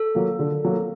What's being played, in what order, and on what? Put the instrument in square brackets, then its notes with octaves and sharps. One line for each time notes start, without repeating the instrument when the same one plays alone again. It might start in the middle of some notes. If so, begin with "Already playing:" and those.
Already playing: [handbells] A4
[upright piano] F#3 A#3
D3
F#3 A#3